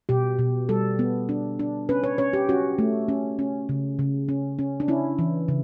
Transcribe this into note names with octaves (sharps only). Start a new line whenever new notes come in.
B2 G4
B2
G3 A4
B3
D4
D4
C#4 B4
C#5
C#4 C#5
G4
C#4 F#4
A3
C#4
C#4
C#3
C#3
C#4
C#4
D4
C#4 E4
E3
C#3